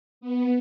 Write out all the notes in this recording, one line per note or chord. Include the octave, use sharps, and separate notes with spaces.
B3